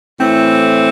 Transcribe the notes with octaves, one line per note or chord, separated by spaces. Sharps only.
A2 E3 A3 C4